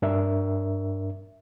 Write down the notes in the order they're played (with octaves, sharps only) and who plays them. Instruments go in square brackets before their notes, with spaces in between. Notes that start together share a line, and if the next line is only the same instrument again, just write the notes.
[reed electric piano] G2 D4 A#4 E5